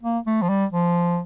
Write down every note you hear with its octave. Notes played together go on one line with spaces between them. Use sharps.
A#3
A3
F3
G3
F3